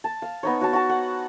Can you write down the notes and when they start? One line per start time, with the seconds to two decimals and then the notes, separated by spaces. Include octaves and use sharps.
0.04 A5
0.22 F5
0.43 B3 D#4 C#5
0.61 F#4 C#5 A5
0.73 F#4 A5
0.89 F#5